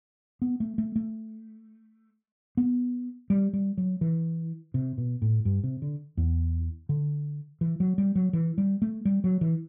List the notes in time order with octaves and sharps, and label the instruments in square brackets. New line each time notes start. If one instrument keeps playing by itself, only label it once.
[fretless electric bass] B3
A3
A3
A3
B3
G3
G3
F#3
E3
C3
B2
A2
G2
C3
D3
E2
D3
E3
F#3
G3
F#3
E3
G3
A3
G3
F#3
E3